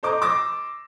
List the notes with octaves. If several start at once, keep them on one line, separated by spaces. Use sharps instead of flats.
A4 C5 D#5 A#5 D6
C6 D6 E6 A#6